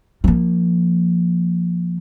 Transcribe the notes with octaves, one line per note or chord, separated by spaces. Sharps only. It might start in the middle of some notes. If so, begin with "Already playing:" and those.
F3 A#3